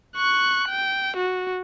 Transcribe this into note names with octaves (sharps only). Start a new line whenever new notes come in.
C#6 F#6
G5
F#4